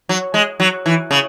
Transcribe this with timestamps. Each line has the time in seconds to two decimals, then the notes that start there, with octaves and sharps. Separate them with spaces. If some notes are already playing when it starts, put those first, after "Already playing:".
0.09 F#3
0.34 G#3
0.60 F#3
0.86 E3
1.11 C#3